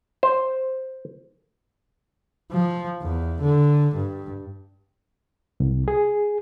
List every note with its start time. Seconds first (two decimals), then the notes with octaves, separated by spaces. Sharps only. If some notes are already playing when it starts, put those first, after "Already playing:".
0.23 C5
2.52 F3
3.02 E2
3.42 D3
3.95 G2
5.60 C2
5.88 G#4